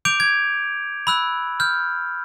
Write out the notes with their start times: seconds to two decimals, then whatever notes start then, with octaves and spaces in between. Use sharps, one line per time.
0.05 D6 G6 D7 F7
0.20 G#6
1.07 B5 E6 F#6
1.60 F6 G6